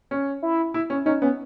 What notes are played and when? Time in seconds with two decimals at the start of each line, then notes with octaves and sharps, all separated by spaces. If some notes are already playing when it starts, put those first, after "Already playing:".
0.11 C#4
0.42 E4
0.74 E4
0.90 C#4
1.05 C#4 D#4
1.22 B3 C#4